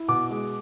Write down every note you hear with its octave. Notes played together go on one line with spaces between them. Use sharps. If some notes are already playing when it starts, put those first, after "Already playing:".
Already playing: E4
B2 D6
G#3